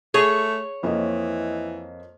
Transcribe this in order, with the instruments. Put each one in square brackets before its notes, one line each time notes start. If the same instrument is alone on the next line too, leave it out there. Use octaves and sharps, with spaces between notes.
[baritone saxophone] A3 [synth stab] G#4 [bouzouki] C#5
[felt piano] F2 A#3 D#5 [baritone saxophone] E3